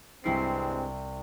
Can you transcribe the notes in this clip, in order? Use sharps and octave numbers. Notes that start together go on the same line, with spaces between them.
C2 G2 G#3 C4 E4 C7